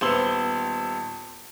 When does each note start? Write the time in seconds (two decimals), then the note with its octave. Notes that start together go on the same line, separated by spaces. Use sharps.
0.01 D#1 B3 C5 E6 F#7 G7